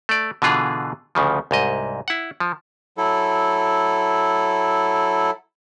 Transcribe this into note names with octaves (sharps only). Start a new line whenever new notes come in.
A3 D5
B2 D3 E3 F4 G#4
D2 C#3 F3
C2 G#2 D#5
E4 F#5
F3
F#3 E4 A4